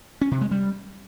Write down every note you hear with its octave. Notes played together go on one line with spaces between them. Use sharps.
C#4
C3
G#3
G3